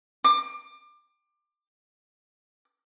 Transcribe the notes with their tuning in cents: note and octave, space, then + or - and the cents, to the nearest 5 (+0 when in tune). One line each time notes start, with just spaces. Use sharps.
D6 +25